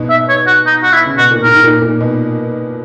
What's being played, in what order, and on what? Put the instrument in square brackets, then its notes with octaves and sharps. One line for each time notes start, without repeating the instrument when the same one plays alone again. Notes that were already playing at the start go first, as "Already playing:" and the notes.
Already playing: [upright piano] G#2 B2
[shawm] E5
C#5
F#4
D#4
F#4
E4
[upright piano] C#3
[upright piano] B2 [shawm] F#4
[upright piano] A#2
[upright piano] G#2 [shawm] A#4
[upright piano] G#2
A#2
A#2
B2